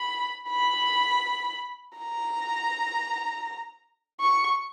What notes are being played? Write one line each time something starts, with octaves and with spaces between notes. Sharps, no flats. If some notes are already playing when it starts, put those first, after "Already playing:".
Already playing: B5
B5
A#5
C#6